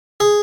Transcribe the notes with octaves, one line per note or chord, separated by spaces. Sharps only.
G#4